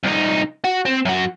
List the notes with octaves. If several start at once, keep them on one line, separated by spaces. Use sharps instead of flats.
C2 D#4
F#4
C4
F#2 F#4